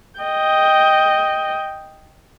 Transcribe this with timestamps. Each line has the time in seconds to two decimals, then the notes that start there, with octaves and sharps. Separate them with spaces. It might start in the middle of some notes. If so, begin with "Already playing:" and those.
0.20 D#5 G5